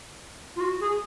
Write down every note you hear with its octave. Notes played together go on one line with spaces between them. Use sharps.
F4
F#4
G#4